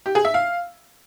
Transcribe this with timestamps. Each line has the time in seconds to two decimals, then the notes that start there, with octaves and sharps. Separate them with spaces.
0.06 G4
0.15 G#4
0.25 E5
0.34 F5